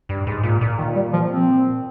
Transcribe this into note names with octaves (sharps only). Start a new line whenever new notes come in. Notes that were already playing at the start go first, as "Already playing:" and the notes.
G2
G#2
A#2
A#2
D#3
G3
F3
C4